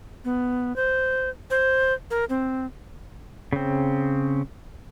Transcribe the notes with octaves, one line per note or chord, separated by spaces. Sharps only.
B3
C5
C5
A#4
C4
C#3 C4